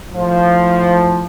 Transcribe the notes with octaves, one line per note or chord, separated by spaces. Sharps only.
A2 F3